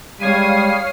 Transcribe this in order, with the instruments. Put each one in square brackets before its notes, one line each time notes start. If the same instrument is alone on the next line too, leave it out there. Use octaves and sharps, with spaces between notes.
[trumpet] G3 [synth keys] G#3 G#6 D#7 [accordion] C#5 F5 [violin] D#6 C7